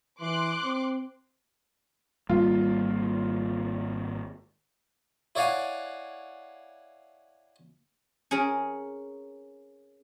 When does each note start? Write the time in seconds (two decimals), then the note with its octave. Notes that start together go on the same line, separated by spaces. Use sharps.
0.20 E3 C6 D6 F#6
0.64 C4
2.29 G#1 G3 A#3 F4
5.35 E4 C#5 D5 F5 F#5 G#5
8.31 C#4 G#4 A#4